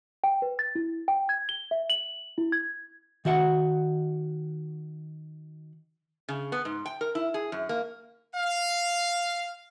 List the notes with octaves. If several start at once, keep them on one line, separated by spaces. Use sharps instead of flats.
G5
B4
A6
E4
G5
G#6
G7
E5
F#7
E4
G#6
D#3 F#4 E5 F#5
C#3
B3
G#2
G5
A#4
E4
G#4
F#2
A#3
F5